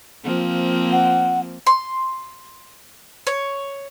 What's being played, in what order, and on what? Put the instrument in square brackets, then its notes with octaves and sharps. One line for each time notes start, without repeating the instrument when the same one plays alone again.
[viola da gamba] F3 A#3 C4
[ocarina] F#5
[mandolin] C6
C#5